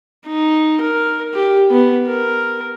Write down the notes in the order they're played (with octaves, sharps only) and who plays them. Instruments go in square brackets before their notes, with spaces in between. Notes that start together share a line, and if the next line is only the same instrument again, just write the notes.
[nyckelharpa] D#4
A#4
G4
B3
A#4